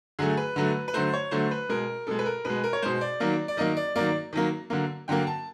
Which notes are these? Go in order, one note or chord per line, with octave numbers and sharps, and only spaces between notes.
D3 F#3 A3 G#4
B4
D3 F#3 A3
B4
D3 F#3 A3 C5
C#5
D3 F#3 A3 C5
B4
B2 G#3 A#4
B2 G#3 A4
B4
A#4
B2 G#3 B4
A#4
C#5
B2 G#3 C5
D5
D#3 F#3 A#3
D5
D#3 F#3 A#3 D#5
D5
D#3 F#3 A#3 D5
D#3 F#3 A#3
D3 F#3 A#3
D3 F#3 A#3 G5
A5